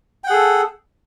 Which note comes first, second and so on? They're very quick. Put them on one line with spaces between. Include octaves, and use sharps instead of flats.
G5 F#5 G#4 A4